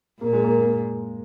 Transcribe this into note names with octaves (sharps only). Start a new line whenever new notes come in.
A#2 A#3
G#3
A#3
A#3